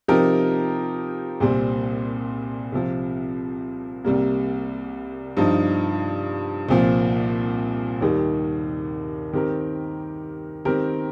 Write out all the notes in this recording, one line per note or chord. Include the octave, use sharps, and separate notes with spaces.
C3 F3 D#4 G4 A#4
C2 A#2 G3 C4
C2 C3 F3
C2 C3 G3 A#3
G2 F3 D#4
C2 A#2 F3
D#2 D#3 G3
D#3 C4 G4 A#4
D#3 C4 G4 A#4